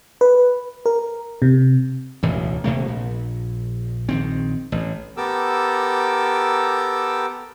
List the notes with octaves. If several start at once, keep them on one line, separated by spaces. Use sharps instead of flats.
B4
A#4
C3
E1 A1 D2
D#1 C3 A3 A#3
A#1
A#1 D#3 C4
A1
B3 G4 A4 A#4 D6 E6